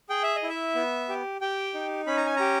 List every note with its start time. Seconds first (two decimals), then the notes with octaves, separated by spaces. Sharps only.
0.09 G#4 G5
0.24 E5
0.36 D#5
0.43 E4
0.49 E5
0.75 B3
1.09 G4
1.41 G4 G5
1.74 D#4
2.07 C#4 B5
2.17 A#5
2.26 G#5
2.36 G4 A#5